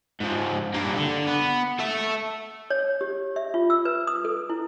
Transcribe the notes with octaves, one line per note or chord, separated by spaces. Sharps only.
G#2 F3
G2 A#3
D3
B3
A4 E5
C#5
G4
E5
F4
E6
B4
D#6
A4
E4